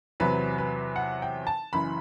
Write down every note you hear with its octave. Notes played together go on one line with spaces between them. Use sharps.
E2 C3 F#3 B4
B4
F#5
G5
A5
F#1 F#2 E3 B5